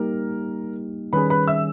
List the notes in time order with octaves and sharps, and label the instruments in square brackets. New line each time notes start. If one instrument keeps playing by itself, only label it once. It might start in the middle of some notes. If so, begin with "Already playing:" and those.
Already playing: [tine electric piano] G3 A#3 D#4 G4 [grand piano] A#4
[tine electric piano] D#3 G3 C#4 G#4 [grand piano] B4 B5
[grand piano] B4 B5
E5 E6